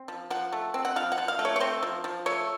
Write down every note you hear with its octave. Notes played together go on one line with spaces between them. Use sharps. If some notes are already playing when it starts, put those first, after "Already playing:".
Already playing: C4
F3
F3 F#5
A3
C4
F#5
F3 F5
F#5
F3
F5
A3
C#5
C#5
C4 C5
F3
F3
A3 C#5